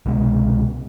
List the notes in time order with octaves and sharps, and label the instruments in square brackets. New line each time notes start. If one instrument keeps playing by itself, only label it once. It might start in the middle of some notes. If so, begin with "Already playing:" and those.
[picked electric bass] C2 B2 G#3